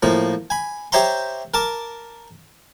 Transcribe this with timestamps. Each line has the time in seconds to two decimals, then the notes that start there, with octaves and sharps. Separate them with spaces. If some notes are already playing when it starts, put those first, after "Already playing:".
0.03 A2 F3 A#3
0.50 G#5 B5
0.92 G4 C5 C#5 E5 A#5 C6
1.54 A#4 A5 D6